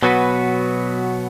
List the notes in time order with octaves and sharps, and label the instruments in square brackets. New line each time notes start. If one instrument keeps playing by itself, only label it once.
[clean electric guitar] B2 F#3 B3 F#4 B4